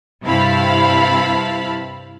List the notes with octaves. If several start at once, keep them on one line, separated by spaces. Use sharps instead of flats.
G2 C3 E4 F5 A5 B5